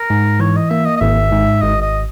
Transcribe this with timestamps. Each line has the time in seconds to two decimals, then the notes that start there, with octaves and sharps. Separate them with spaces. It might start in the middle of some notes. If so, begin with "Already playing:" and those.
Already playing: A#4
0.10 G#2
0.40 E3 C#5
0.56 D#5
0.70 A#3 E5
0.86 D#5
0.97 D#5
1.00 G#1 E5
1.32 G#2
1.62 G#1 D#5
1.82 D#5